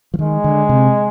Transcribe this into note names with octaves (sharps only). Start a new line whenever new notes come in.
F3
D#3 G#3
D3
C3